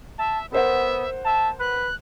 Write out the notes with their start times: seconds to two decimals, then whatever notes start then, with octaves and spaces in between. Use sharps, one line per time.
0.18 E5 A5
0.52 B3 A#4 C5 E5 F#5
1.25 E5 A5
1.60 B4 F#6